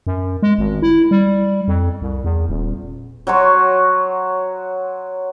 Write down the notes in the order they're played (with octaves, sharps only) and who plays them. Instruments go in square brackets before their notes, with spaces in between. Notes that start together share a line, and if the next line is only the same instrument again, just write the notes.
[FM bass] F#2
G#3
G#1
E4
G3
F2
C2
E2
D#1
[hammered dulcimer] F#3 F#4 C#5 C6